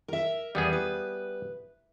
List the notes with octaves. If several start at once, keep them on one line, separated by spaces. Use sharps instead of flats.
A#4 E5
E2 G3 B3 G#4
B4